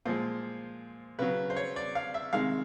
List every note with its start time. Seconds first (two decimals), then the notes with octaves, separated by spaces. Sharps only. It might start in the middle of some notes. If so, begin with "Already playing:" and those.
0.06 A#2 F3 G#3 C5
1.19 C#3 F#3 B4
1.50 C5
1.56 C#5
1.76 D5
1.95 F5
2.14 E5
2.33 C3 D#3 G#3 F5